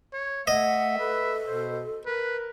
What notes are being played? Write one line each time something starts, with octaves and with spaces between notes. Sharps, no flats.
C#5
A3 D#5 E5 F#5
A4 B4
B2 C5
A#4 B4